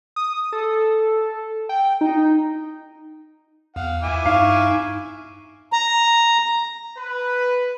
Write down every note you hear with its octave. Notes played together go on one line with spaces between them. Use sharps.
D#6
A4
G5
D#4
E2 F5 F#5
E4 G#5 D6
G2 D#4 F5 C#6
A#5
B4